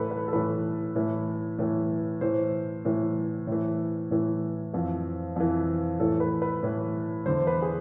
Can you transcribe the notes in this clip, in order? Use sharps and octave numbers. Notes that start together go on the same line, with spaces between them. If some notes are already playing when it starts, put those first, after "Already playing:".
Already playing: A2 E3 A4 B4
B4
A4
A2 E3 B4
A2 E3
A2 E3
A2 E3 C5
A2 E3
A2 E3
A2 E3
F2 E3
F2 E3
A2 E3 A4
B4
B4
A2 E3
E2 D3 C5
B4
G#4